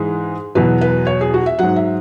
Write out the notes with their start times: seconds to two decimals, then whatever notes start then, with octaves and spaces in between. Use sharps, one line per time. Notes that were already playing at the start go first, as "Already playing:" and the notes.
Already playing: G#2 E3 G#3
0.55 E2 B2 F#3 B4
0.81 B4
1.07 C#5
1.21 G#4
1.34 F#4
1.46 E5
1.59 G#2 F#3 F#5
1.76 E5